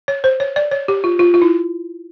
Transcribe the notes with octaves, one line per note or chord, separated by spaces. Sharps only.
C#5
C5
C#5
D5
C#5
G4
F4
F4
F4
E4